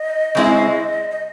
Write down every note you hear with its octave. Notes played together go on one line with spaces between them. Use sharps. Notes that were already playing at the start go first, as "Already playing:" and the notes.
Already playing: D#5
C#3 G#3 C4 E4
D#5